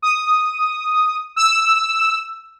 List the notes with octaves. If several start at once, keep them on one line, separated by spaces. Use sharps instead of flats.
D#6
E6